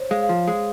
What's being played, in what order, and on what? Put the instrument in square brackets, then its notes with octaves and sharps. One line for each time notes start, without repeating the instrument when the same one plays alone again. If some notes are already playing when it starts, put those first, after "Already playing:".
Already playing: [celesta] C5 C#5
[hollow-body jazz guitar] G#3 [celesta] F5
[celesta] F5
[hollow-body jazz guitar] F3
G#3